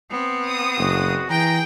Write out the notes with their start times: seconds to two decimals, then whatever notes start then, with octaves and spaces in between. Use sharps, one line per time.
0.11 B3 C4
0.47 D#6
0.78 F#1 F#4
1.30 E3 G#4 G5 A#5